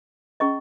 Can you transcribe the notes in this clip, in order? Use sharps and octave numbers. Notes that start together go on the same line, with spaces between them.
C#4 G#4 D#5 A#5 C#6